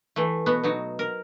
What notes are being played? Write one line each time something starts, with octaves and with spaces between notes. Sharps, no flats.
E3 A3
B2 B3 F#4
B2 F#3 D#4
A#4